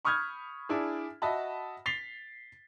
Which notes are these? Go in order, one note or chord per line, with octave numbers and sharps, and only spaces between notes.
B5 C#6 D#6 F6 G6 G#6
D4 E4 G#4
F#4 D#5 E5 A5 B5
A6 B6 C7 F7 G7